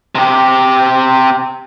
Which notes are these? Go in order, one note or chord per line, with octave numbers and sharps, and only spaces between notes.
C3 G4